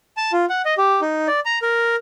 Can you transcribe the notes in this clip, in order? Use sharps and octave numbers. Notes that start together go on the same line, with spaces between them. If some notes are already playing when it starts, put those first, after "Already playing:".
A5
F4
F#5
D#5
G4
D#4
D5
A#5
A#4